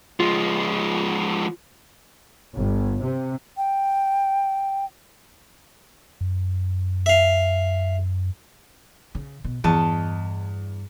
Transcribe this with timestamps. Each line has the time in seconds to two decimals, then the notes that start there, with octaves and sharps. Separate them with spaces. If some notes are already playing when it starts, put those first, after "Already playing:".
0.20 F3 G#3 F4
2.55 G1
3.01 C3
3.57 G5
6.21 F#2
7.06 E5 F5
9.15 C#3
9.44 B2
9.64 E2 G2 D#5 A5 C#6